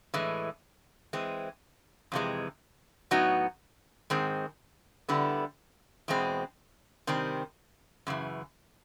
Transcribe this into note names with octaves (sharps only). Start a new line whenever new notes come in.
A2 E3 G#3
E3 G#3 C4
F2 C3 E3 G#3
A2 F#3 B3 D#4 F#4
G#2 D#3 G#3 C4
D3 G3 B3 E4
E2 B2 G#3 C4
C3 D#3 G3 C4
F#2 C#3 E3